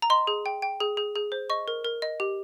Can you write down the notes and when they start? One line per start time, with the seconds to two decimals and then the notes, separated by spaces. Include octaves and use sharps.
0.02 A#5
0.10 D#5 C6
0.27 G#4
0.46 G5
0.62 G5
0.80 G#4
0.97 G#4
1.15 G#4
1.32 C5
1.50 D#5 C#6
1.68 A#4
1.85 A#4
2.02 D#5
2.20 G4